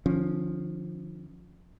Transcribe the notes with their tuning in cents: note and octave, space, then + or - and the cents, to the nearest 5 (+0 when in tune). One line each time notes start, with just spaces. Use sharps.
D3 +45 F3 +15 C#4 +0